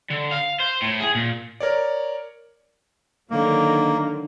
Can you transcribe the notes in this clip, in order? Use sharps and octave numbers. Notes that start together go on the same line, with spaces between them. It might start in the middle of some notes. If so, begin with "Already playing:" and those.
D3
F5
C5
A2
G#4
A#2
A#4 C#5 D5
D3 D#3 F#3 A#3